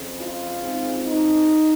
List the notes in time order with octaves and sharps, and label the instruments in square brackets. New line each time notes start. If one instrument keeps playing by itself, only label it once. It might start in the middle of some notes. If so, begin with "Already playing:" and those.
Already playing: [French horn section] F2 C#3 F3
F4
C#3 G#3 C4 D#4
D#4